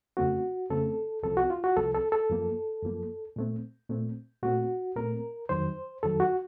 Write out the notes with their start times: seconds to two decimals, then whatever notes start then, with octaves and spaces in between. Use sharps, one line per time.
0.17 F2 C#3 A3 C4 F#4
0.70 F2 C#3 A3 C4 A4
1.23 C2 C3 F3 C4 A4
1.37 F#4
1.50 F4
1.64 F#4
1.77 C2 C3 F3 C4 A4
1.95 A4
2.12 A4
2.30 F#2 F3 A#3
2.83 F#2 F3 A#3
3.36 A#2 A3 C4
3.89 A#2 A3 C4
4.43 A#2 A3 C4 F#4
4.96 A#2 A3 C4 A#4
5.49 F2 D#3 F#3 C5
6.03 F2 D#3 F#3 A4
6.20 F#4